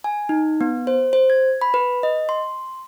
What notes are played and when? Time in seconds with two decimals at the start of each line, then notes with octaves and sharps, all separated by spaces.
0.04 G#5
0.29 D#4
0.61 B3
0.87 C5
1.13 C5
1.30 G#6
1.61 B5
1.74 B4
2.03 D#5
2.29 C6